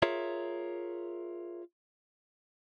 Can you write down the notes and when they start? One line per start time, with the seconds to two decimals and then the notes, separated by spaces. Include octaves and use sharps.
0.02 F4 G#4 A#4 C#5 E5